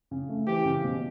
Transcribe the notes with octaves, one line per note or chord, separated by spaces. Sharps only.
C#3
A3
E3 G4
C#3
B2